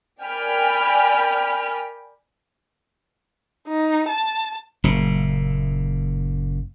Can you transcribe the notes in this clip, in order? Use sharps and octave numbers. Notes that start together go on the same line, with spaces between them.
A#4 D5 G5 G#5 B5 F6
D#4
A5
F#1 A#2